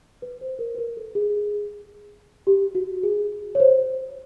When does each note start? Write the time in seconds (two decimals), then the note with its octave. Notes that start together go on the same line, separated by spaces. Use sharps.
0.22 B4
0.41 C5
0.59 A#4
0.75 B4
0.78 A#4
0.97 A4
1.15 G#4
2.47 G4
2.75 F#4
3.03 G#4
3.55 C#5
3.60 C5